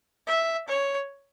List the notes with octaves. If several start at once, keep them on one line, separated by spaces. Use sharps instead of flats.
E5
C#5